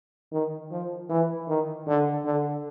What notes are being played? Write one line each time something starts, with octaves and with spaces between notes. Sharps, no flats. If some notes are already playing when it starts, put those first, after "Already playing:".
D#3
F3
E3
D#3
D3
D3